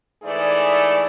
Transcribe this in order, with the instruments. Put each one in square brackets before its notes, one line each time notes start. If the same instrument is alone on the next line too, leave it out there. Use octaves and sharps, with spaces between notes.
[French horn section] G#2 E3 A3 G#4 D5